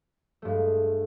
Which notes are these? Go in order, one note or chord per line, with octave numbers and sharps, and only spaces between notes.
G2 G#3 A3